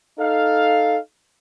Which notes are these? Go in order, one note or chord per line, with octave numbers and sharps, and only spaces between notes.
D#4 A4 F5